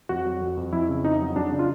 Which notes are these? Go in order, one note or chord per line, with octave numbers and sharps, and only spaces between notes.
F2 F#4
F#3
F2
F2
F2 E4
C#3
F2 D#4
F#3
F#3 D4
C#3
F4